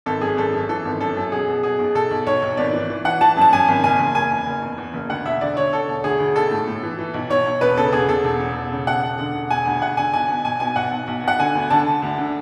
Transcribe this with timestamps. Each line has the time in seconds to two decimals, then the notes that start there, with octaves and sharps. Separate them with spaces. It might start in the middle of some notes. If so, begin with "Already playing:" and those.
0.06 G#1 A4
0.21 F#2 G#4
0.37 G#1 A4
0.53 F#2
0.69 E3 A4
0.85 G#1
1.01 F#2 A4
1.16 F#2
1.32 B2 G#4
1.48 B2
1.63 B2 G#4
1.79 B1
1.95 B1 A4
2.11 B1
2.26 B1 C#5
2.42 B1
2.57 G#1 D5
2.73 E3
2.90 E3
3.05 E3 F#5
3.21 E3 A5
3.37 F#2 A5
3.52 F#2 G#5
3.68 G#1
3.83 F#1 G#5
3.99 F#1
4.15 F#1 G#5
4.31 E2
4.47 F#1
4.62 E2
4.78 E2
4.94 F#1
5.10 D2 F#5
5.25 E1 E5
5.41 D3 D5
5.57 D3 C#5
5.73 D3 A4
5.88 E1
6.04 D2 G#4
6.20 D2
6.36 B1 A4
6.51 A2
6.67 A2
6.83 E3
6.99 E3
7.14 B1
7.30 B1 C#5
7.46 B1
7.61 E1 B4
7.77 C#3 A4
7.92 E1 G#4
8.08 E1 A4
8.24 E1
8.40 E2
8.56 E1
8.72 C#3
8.87 E1 F#5
9.03 E1
9.19 D3
9.35 E1
9.51 E1 G#5
9.65 D2
9.82 E1 F#5
9.97 D3 G#5
10.13 B1 G#5
10.29 B2
10.45 B1 G#5
10.60 B2 G#5
10.76 B1 F#5
10.92 B1
11.07 B1
11.23 B2 F#5
11.39 D3 G#5
11.55 D2
11.70 D3 A5
11.87 D3
12.02 D2
12.18 D3